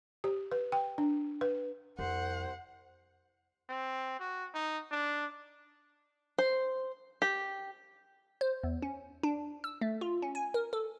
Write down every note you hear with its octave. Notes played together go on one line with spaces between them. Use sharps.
G4
B4
G5
D4
B4
C2 F2 C5 F#5
C4
F#4
D#4
D4
C5
G4
C5
E2
C#4
D4
E6
A3
F4
C#4
G#5
A#4
A4